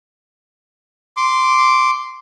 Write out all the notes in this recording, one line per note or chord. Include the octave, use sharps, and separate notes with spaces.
C6 D6